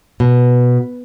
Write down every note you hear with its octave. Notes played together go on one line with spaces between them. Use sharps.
B2